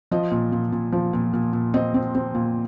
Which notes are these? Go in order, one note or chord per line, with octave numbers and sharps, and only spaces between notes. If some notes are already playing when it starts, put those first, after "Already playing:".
F3 D#5
A#2
A#2
A#2
F3
A#2
A#2
A#2
C4 D#5
C4
C4
A#2